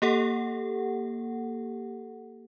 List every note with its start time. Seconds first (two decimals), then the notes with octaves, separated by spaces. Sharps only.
0.02 A#3 G4 A4 F#5